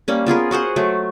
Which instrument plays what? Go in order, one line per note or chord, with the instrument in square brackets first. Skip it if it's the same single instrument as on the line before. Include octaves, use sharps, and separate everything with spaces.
[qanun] G3 A#3 C#4
B3 F4 G#4 A#4
F#4 G#4 C5 F#5
F#3 A3